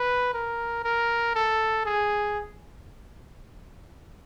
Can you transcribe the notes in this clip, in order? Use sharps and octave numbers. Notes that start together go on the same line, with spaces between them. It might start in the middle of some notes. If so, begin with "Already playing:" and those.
Already playing: B4
A#4
A#4
A4
G#4